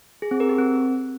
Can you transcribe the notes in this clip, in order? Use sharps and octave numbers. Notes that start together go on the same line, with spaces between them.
G#4
C4
A#4
G4
C4